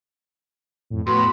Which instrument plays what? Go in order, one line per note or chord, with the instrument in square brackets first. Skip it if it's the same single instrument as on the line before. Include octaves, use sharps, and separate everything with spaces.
[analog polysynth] F2 A2
[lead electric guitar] A2 [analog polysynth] B3 F#4 B5 [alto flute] C6